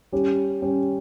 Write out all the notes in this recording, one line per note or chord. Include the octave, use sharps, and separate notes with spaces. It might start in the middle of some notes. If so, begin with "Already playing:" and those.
G3 C#4 G4
G3 C#4 G4